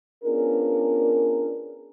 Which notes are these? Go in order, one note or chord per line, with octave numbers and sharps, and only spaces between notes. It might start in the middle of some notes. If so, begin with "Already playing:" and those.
B3 C#4 D4 F4 G#4 A#4